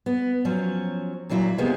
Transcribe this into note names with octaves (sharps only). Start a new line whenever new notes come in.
B3
F3 F#3 C#4
A#2 E3 F#3 E4 F4
C3 F3 G#3 A#3 B3